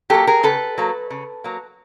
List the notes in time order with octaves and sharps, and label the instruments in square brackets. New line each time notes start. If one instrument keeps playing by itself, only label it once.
[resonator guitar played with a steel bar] F#3 A#3 G4 A4
G#4 A#4
C#3 A4 B4
F#3 A#3
C#3
F#3 A#3